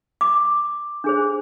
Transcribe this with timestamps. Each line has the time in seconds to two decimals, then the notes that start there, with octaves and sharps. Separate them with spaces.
0.21 D6
1.04 D4 G#4 C5